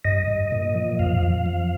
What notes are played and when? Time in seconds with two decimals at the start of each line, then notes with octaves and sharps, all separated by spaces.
0.05 G2 D#5
0.28 G2
0.52 A#2
0.75 F3
0.99 F2 F5
1.23 F2
1.46 F3